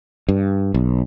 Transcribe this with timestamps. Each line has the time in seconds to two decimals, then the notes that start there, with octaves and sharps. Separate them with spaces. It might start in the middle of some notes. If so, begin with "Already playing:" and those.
0.29 G2
0.74 B1